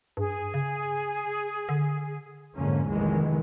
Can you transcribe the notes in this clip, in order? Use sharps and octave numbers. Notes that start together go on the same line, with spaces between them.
G2 G#4
C#3
D3
F2 G#2 D3 A#3 C#4
F1 A#1 D#3 E3 G#3